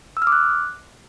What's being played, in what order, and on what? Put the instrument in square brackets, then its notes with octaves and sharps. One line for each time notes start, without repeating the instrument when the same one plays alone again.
[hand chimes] E6
F6
D6
F#6